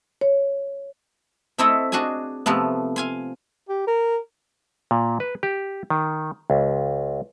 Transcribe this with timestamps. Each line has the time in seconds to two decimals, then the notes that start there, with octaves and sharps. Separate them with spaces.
0.21 C#5
1.58 A3 C4 E4 A4 D#5 E5
1.92 D4 F#4 G#4 D#5 G#5
2.46 C3 F3 A3 B3
2.96 F5 G#5 C6
3.69 G4
3.87 A#4
4.91 A#2
5.20 B4
5.43 G4
5.90 D#3
6.50 C#2